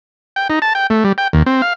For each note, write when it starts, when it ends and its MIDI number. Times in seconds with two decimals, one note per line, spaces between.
0.36 0.48 79
0.50 0.59 63
0.62 0.73 81
0.75 0.87 79
0.90 1.04 57
1.04 1.12 55
1.18 1.28 79
1.33 1.43 39
1.46 1.62 60
1.62 1.73 77